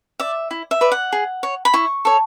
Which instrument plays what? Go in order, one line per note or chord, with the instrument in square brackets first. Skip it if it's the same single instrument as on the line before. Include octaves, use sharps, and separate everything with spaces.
[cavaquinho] D5 E5
E4
E5
B4 D5
F#5
G#4
C#5
B5
E4 C#6
A4 C#5